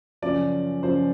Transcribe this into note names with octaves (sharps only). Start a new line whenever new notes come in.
F#2 C#3 F3 D5
F#2 C#3 F3 C5